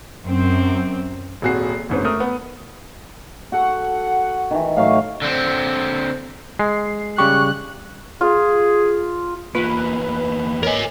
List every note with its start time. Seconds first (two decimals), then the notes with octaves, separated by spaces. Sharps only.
0.25 F#2 C4
1.42 D#1 G#1 F#4 G#4 C7
1.89 F#1 C2 G#2 C#4 B4
2.04 A3 A#4 D#6
2.20 B3
3.52 F#4 A4 F#5
4.51 D#3 E3
4.76 A2 F#3 F5 C#6
5.22 D3 C4
6.59 G#3 C7
7.18 C#3 G3 G4 C#6 F#6
8.21 F4 G#4
9.55 E2 A#3 F4 B4
10.63 A#4 C#5 D#5 G#5